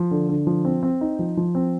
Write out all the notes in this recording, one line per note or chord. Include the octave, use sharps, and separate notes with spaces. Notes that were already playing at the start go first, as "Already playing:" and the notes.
Already playing: F3
D3
D3
F3
C4
C4
D#4
F3
F3
C4